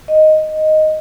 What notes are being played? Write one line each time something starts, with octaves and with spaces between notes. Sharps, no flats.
D#5